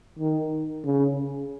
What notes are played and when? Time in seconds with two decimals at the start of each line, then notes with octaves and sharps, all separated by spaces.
0.19 D#3
0.84 C#3